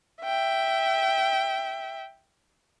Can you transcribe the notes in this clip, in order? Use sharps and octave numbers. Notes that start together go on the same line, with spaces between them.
E5 G5